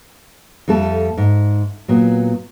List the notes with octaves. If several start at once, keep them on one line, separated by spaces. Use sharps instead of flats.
F2 G3 A3 A4
G#2
A#2 F#3 B3